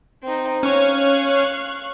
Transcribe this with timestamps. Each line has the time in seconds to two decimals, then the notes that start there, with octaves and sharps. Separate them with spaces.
0.23 C4 D#4
0.63 C#4 C#5 F5 C#6 F#6